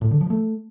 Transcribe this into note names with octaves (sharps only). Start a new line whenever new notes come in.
A2
D3
F3
A3